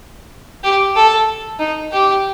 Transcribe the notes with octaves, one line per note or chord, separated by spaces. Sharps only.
G4
A4
D#4
G4